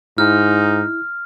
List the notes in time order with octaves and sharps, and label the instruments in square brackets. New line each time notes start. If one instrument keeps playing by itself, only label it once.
[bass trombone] G#2 [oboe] D#4 [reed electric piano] E4 [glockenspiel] F6